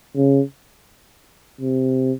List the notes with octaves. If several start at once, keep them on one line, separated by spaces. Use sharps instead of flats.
C#3
C3